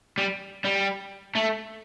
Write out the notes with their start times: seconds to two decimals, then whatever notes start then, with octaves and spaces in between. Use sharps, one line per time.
0.18 G3
0.65 G3
1.35 A3